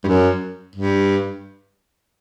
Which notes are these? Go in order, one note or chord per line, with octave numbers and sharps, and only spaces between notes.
G2
F#2
G2